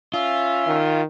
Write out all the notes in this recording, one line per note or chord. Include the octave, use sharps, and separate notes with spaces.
C#4 F4 E5
D#3